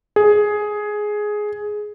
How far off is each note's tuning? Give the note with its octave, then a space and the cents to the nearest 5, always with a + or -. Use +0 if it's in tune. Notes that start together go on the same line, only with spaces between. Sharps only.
G#4 +10